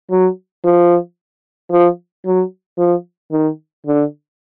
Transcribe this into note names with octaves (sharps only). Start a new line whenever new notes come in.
F#3
F3
F3
F#3
F3
D#3
D3